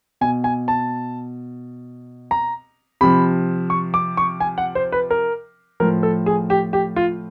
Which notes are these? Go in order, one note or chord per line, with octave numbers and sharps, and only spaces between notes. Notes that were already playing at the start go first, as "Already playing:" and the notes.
B2 G#5
G#5
A5
A#5
C3 F3 B5
C#6
D6
C#6
G#5
F#5
C5
B4
A#4
A2 F3 A#4
A4
G#4
G4
G4
F4